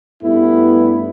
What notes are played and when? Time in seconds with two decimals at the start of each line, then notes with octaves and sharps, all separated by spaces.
0.23 G2 A3 B3 E4